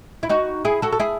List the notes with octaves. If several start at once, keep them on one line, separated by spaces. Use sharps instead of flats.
E4
D#4 F#4
E4 G#4
F#4 A4
A4
E4 G#4